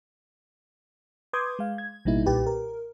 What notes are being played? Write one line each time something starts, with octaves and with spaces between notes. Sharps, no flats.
B4 C6 D6 D#6 G6 G#6
G#3 F5
G#6
A1 B2 G3 A#3 D#4 E4
B1 A#2 G4 B4
A#4